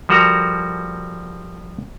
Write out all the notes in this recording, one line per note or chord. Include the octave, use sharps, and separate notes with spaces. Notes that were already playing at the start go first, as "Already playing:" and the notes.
F3 G3 F#4 A4 A#4 A#5